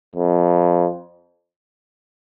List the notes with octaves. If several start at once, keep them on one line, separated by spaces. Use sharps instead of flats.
F2